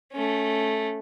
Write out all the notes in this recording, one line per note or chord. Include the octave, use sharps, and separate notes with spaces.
A3 C#4